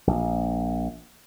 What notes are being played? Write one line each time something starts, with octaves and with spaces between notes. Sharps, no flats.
A#1